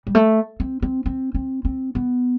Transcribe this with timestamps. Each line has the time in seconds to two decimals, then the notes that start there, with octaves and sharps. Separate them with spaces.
0.07 G3
0.15 A3
0.60 C4
0.82 C4
1.06 C4
1.34 C4
1.65 C4
1.95 B3